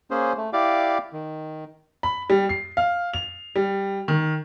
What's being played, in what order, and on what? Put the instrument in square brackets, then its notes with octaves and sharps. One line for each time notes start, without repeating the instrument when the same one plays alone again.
[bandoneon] A#3 C#4 G#4 C5
A3
E4 G4 D5 F5 D6
D#3
[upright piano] B5
G3
C7
F5
F7
G3
D#3